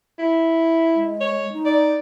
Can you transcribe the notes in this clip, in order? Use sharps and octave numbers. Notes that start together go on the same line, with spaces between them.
E4
G#3
C#5
D#4
D5